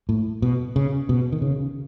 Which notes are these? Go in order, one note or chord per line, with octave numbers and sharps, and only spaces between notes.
A2
B2
C#3
B2
D#3
C#3